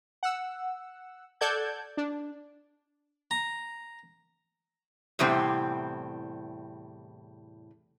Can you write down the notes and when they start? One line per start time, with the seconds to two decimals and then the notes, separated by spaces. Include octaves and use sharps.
0.23 F#5 E6
1.41 A4 D5 F#5 A5 G6 G#6
1.97 D4
3.31 A#5
5.19 E2 A2 C3 G3 C4